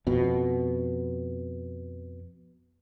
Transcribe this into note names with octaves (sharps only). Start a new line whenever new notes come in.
F2 B2